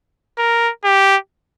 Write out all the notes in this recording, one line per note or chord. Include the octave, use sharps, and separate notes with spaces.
A#4
G4